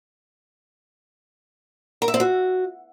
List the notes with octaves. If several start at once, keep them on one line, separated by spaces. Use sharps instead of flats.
A#4
E5
C4
F#4